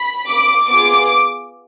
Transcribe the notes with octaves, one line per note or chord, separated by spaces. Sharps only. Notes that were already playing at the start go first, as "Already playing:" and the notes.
Already playing: B5
D6
B3 F4 G#4 D6